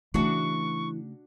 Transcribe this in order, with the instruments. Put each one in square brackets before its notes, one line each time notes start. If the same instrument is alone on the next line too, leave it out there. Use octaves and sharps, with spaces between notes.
[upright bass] C#3 A3 [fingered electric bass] E3 [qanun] D4 F#4 [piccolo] C#6